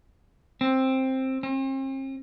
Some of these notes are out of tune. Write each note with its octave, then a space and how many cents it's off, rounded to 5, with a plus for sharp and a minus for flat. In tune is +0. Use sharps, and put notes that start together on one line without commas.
C4 +10
C4 +45